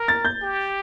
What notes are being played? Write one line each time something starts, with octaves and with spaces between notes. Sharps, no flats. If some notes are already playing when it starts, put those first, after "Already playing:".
Already playing: A#4
A6
G6
G4